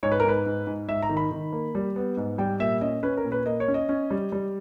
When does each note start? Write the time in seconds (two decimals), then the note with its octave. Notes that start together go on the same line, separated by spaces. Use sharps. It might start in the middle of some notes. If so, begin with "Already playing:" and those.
0.03 G#2 C#5
0.12 B4
0.20 A#4
0.24 G#2 B4
0.46 G#2
0.67 G#2
0.88 G#2 E5
1.02 A#5
1.09 D#3
1.17 B5
1.31 D#3
1.52 A#3
1.75 G3
1.96 B3
2.17 G#2
2.38 G3 G5
2.60 A#2 E5
2.81 C#4 D#5
3.03 C#4 B4
3.17 A#4
3.24 A#2
3.32 B4
3.46 A#3 D#5
3.60 C#5
3.68 C#4
3.74 D#5
3.89 C#4
4.11 G3
4.32 G3